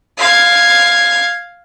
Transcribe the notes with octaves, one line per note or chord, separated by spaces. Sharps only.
F5 G#6